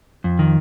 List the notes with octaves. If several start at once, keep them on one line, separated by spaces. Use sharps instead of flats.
F2
D#3